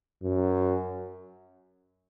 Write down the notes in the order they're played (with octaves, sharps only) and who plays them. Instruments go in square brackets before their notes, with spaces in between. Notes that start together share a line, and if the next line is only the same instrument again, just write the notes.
[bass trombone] F#2